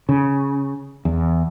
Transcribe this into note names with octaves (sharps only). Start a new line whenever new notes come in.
C#3
E2